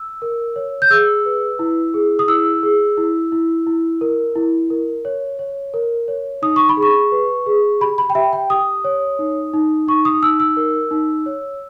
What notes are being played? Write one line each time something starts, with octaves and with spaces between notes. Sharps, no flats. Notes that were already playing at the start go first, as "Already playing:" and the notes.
Already playing: E6
A#4
C#5
G6
G#4 E6
B4
E4
G#4
D#6
E4 E6
G#4
E4
E4
E4
A#4
E4
A#4
C#5
C#5
A#4
C#5
D#4 D#6
C#6
B5
G#4
C#6
B4
G#4
G4 B5
B5
G5
G4 E5
G5
G4 D#6
C#5
D#4
D#4
D#4 C#6
D#6
D#4 E6
E6
A#4
D#4
C#5